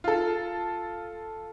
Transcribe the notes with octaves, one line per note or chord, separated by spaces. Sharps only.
F4 A4